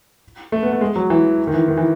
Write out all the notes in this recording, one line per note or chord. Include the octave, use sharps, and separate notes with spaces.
A3
B3
A3
G#3
F#3
E3
D#3
E3
D#3
E3